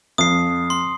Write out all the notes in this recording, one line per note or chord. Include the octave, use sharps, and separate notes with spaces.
F2 D#6 C7
C6